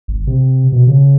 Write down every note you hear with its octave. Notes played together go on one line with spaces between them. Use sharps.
G#1
C3
B2
C#3